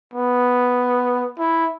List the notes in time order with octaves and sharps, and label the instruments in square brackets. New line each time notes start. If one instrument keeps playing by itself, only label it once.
[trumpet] B3
E4